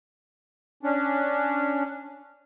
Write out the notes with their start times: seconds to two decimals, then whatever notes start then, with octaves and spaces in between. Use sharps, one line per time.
0.83 C#4 D4